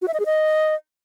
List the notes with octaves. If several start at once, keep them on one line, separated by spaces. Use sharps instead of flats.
F#4
E5
D#5
G#4
D#5